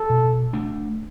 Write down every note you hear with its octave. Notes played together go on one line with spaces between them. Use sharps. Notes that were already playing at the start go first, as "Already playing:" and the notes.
Already playing: A4
B2
A3 D4